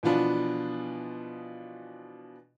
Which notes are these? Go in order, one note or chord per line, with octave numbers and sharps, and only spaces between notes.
B2 E3 F3 B3 D4 F4